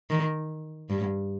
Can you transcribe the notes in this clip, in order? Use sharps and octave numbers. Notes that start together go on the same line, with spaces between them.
D#3
G2